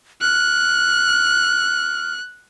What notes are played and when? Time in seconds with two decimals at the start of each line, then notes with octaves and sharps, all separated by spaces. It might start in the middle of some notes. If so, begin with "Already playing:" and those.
0.21 F6 F#6